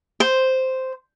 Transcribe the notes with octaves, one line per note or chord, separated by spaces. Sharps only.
C5